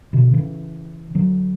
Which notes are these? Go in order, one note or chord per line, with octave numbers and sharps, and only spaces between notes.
B2 D3
C#3 E3
D3 F#3